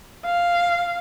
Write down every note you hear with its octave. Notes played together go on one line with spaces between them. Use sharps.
F5